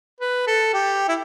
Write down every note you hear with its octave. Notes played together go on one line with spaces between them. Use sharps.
B4
A4
G4
E4